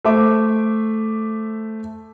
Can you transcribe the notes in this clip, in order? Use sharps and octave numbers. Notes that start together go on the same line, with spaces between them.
A3 C5 E5 D6